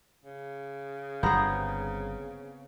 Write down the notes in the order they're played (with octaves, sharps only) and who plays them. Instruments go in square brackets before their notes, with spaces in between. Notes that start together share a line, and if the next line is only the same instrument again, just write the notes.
[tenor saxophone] C#3
[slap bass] G1 G2 [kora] B3 C4 G#4 [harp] A#5 G6